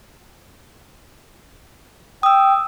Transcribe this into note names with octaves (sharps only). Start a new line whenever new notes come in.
G5 D#6 E6